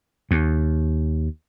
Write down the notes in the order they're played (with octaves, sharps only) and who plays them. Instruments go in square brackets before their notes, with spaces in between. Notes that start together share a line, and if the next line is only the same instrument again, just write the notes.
[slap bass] D#2